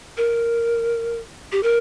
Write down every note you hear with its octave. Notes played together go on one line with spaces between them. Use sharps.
A#4
G4
A#4